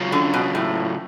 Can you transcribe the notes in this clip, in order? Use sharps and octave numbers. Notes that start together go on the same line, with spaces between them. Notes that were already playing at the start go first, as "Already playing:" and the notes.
Already playing: C#3 F#3 C#4 F4
D3
B2
A2